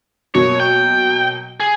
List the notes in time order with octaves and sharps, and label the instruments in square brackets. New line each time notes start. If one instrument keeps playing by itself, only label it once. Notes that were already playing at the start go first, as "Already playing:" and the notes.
[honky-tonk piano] B2 F#3 A#3 [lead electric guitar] C#5
[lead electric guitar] G5
G#4